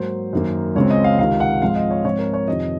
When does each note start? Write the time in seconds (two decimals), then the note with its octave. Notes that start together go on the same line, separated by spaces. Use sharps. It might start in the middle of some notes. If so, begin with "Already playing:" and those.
Already playing: G#2 F#3 A#3 C5
0.33 F#2 D#3 A#3
0.75 C#2 C#3 G#3 C4 C#5
0.90 D#5
1.04 F5
1.18 C#2 C3 D#3 F5
1.40 F#5
1.62 G#2 F3 G#3 C4 F5
1.76 D#5
1.90 C#5
2.04 G#2 F3 C4 C#5
2.19 A#4
2.34 C#5
2.48 F2 C3 D#3 D#5